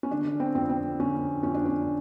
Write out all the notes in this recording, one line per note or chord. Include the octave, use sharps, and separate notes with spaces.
C#4
D3 D4
C4
F2 C4
C4
D3 C#4
F2 C#4
D4
C#4